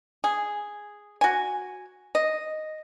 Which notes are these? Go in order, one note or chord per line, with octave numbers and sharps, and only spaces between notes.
G#4
F#4 G#5
D#5